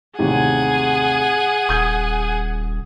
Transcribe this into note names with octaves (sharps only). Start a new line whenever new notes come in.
A1 D#2 C3 G#4 F#5 G#5
D#1 D#6 G6 G#6